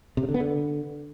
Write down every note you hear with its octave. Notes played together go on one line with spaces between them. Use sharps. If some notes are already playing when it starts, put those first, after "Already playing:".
C3
C#3
D3
B3
D3